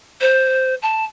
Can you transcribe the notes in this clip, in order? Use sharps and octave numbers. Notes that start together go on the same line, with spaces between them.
C5
A5